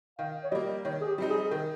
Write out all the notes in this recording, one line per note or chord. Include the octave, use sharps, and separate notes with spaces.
D#3 F5
C#5
G3 A#3 D#5
D#3 C#5
G#4
G4
G3 C4 D#4
G#4
G#4
D#3 A#4